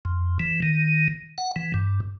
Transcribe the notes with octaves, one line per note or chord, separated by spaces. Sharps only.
F2
E3
D#3
F#5
E3
G2